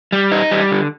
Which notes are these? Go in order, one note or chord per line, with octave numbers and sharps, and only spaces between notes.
G3
D#4
G3
D3